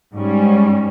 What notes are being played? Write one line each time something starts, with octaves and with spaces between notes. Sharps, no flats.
G#2 G3 C#4